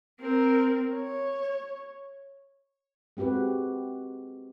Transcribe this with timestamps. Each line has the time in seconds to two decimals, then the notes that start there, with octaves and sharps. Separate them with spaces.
0.20 C4 A#4
0.94 C#5
3.17 G#3 C4 F#4 G4 B4